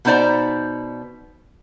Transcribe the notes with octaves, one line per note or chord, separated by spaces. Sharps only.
B2 B3 D#4 C5 D5 A#5